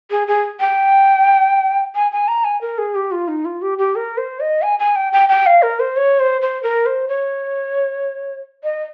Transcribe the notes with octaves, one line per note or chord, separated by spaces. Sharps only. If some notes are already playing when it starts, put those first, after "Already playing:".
G#4
G#4
G5
G#5
G#5
A#5
G#5
A#4
G#4
G4
F4
D#4
F4
G4
G4
A#4
C5
D#5
G#5
G#5
G5
G5
G5
F5
A#4
C5
C#5
C5
C5
A#4
C5
C#5
D#5